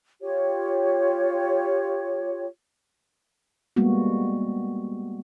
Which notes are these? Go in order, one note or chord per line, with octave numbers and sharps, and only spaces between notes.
F4 G4 C#5
G3 G#3 A#3 B3 F#4